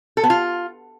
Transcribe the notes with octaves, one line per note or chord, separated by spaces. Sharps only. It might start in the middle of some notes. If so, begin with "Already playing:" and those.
A4
B3
F4